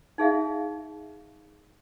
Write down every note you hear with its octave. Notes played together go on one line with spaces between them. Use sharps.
D#4 G#4 E5 F5